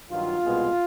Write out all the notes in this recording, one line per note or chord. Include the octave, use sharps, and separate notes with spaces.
G2 D#3 F#3 F4
C2 B2 G#3 B3